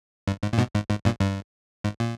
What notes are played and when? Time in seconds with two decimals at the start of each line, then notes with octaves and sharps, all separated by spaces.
0.27 G2
0.43 G#2
0.53 A#2
0.58 G#2 B2
0.75 G#2
0.90 G#2
1.05 G2 A#2
1.21 G2
1.84 G#2
2.00 A#2